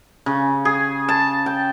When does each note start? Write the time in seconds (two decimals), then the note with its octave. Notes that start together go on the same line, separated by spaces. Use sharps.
0.26 C#3
0.65 G#4
1.09 A5
1.46 G5